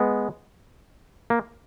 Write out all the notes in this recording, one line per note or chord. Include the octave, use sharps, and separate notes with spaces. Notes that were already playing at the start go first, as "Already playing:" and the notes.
Already playing: G#3 B3
A#3